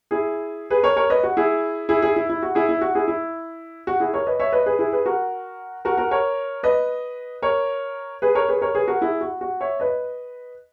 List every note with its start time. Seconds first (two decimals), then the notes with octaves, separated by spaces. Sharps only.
0.11 E4 G#4
0.70 G#4 B4
0.83 A#4 C#5
0.97 A#4 C#5
1.10 B4 D#5
1.23 F#4
1.37 E4 G#4
1.89 E4 G#4
2.02 E4 G#4
2.16 E4
2.29 E4
2.43 F#4
2.55 E4 G#4
2.69 E4
2.81 F#4
2.95 E4 G#4
3.08 E4
3.87 F#4
4.00 E4 G#4
4.14 A#4 C#5
4.27 B4 D#5
4.40 C#5 E5
4.52 B4 D#5
4.66 G#4 B4
4.79 E4 G#4
4.92 G#4 B4
5.06 F#4 A#4
5.85 F#4 A#4
5.97 F#4 A#4
6.11 A#4 C#5
6.63 B4 D#5
7.42 A#4 C#5
8.22 G#4 B4
8.35 A#4 C#5
8.48 G#4 B4
8.62 A#4 C#5
8.75 G#4 B4
8.88 F#4 A#4
9.01 E4 G#4
9.21 F#4
9.41 F#4
9.61 C#5 E5
9.80 B4 D#5